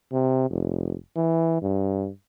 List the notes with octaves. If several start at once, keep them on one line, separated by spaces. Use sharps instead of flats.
C3
F1
E3
G2